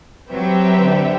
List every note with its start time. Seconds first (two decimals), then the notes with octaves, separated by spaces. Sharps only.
0.31 F#3 C4 G4 B4 E5 G5
0.83 D3